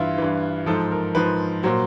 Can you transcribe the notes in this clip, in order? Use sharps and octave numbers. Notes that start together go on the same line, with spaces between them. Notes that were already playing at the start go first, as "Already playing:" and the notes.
Already playing: G2 E3 E4 F4
G2 E3
G#2 F3 A4
A#4
G#2 F3 B4
A#2 F#3 C5